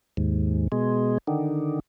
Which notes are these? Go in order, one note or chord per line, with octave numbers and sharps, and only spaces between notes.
D#2 G#2
B2 G#3
D3 D#3